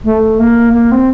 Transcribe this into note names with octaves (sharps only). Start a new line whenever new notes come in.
A3
A#3
A#3
C4